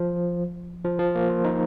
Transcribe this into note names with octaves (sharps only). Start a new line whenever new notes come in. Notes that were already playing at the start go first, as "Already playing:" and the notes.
Already playing: F3
F3
F3
A#3
F4
D#4